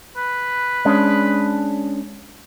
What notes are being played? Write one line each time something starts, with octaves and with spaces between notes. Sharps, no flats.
B4
G#3 C#4 D4